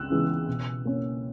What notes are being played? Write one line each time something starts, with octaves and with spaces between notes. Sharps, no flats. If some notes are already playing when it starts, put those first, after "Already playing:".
Already playing: C#2 E6 F#6
C#3 E3 G#3 B3
B2
A#3 C#4